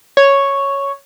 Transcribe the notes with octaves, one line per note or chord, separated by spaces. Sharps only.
C#5